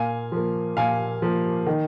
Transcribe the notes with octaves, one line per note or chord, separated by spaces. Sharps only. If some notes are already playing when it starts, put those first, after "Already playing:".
Already playing: A#2 F5 G#5
F3 A#3
A#2 F5 G#5
F3 A#3
D#3